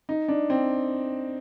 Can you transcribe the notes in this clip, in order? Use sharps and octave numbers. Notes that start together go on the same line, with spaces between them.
D#4
D4
C4